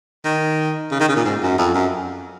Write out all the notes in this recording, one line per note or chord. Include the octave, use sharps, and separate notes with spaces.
D#3
C#3
D#3
C#3
A#2
G#2
F#2
F2
F#2